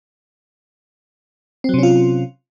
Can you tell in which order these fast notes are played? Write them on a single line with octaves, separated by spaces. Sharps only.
C4 F#3 C3 C#4 F4